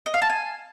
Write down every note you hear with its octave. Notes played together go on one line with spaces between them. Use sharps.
D#5
F5
A5
G#5